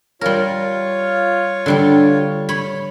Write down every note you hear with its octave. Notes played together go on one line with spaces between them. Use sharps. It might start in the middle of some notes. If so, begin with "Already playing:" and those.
G3 F4 A#4 C#5
D3 G3 G4
C#5 B5